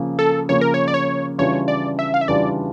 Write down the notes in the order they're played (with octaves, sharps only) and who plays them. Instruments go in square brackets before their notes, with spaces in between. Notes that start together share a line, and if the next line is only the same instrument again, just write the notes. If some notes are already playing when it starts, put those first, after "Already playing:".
Already playing: [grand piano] C#3 F3 A#3
[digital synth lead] A4
[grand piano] C#3 F3 A#3 [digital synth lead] C#5
[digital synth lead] A#4
C#5
D5
C#5
[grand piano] C#3 E3 G3 D4 F4 [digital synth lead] C#5
[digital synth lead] D5
E5
F5
E5
[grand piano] C#3 E3 G3 D4 F4 [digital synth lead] D5